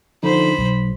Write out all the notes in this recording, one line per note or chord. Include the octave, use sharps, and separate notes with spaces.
D3 F3 D#4 C5 B5
B1